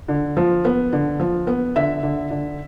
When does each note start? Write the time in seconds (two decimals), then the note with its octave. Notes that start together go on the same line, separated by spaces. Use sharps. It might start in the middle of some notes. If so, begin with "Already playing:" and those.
0.08 D3
0.37 F3
0.65 B3
0.93 D3
1.20 F3
1.47 B3
1.76 D3 E5
2.03 D3
2.31 D3